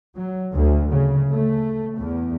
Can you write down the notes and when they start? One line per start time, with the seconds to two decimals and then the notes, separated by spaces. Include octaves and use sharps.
0.15 F#3
0.54 D2
0.93 C#3
1.30 A3
1.95 E2